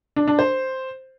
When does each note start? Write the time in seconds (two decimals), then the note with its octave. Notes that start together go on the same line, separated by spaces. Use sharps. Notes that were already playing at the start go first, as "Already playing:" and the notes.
0.16 D4
0.28 D4
0.39 C5